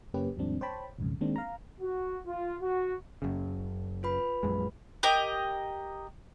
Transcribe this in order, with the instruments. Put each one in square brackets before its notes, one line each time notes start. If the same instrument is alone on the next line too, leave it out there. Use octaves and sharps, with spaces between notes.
[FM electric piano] F#2 C#3 A#3 C#4 G4 B4
D#2 G#2 F3 G3 C4 D4
C5 C#5 G5 A5 B5
B1 F2 G#2 C#3
D#3 G#3 A#3 C4 D4
F5 A#5
[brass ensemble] F#4
F4
F#4
[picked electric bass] F#1 F#2 C#3
[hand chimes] F4 B4 B5
[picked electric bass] A#1 F#2 G#3
[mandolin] G4 A#4 D#5